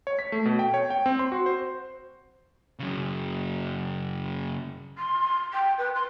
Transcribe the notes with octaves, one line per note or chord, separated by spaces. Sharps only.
C#5
B6
A3
B2
G5
C#5
G5
C4
C6
F#4
C5
F#2 C#3
C6
G5
B4
C6